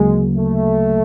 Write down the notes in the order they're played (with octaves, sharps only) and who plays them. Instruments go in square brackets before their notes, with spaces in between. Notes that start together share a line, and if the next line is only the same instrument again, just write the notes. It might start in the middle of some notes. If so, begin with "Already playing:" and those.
Already playing: [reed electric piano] D2 C#3 F#3 A#3 [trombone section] G#3
[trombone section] A3